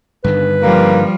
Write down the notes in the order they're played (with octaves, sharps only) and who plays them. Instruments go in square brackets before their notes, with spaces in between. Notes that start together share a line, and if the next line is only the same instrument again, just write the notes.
[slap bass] G2 D3 D#3 [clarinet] B4
[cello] F3 G3 [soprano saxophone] A#3